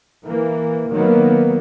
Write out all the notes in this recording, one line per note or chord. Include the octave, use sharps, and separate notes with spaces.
E3 A#3
D#3 F#3 A#3 B3